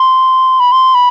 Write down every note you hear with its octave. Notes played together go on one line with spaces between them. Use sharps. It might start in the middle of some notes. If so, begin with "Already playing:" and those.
Already playing: C6
B5
C6
B5